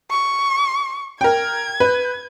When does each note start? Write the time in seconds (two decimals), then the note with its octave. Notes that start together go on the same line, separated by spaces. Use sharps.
0.11 C#6
1.21 A#4 G5 G#6
1.80 B4